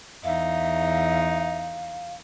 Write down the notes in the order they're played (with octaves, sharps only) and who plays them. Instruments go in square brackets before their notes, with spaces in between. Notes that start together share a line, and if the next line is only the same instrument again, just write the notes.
[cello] E2 D#4 [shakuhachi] E5 [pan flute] F5